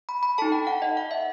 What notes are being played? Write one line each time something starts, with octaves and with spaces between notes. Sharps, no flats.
B5
B5
D#4 A4 A5
G5
F#5
D#5
F#5
E5